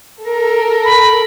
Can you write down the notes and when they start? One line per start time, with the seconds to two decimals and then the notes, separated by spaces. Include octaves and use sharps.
0.24 A4 A#4
0.85 B5